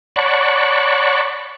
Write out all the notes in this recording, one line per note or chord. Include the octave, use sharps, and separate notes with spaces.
C#5 D5 F#5 A5 B5 C#6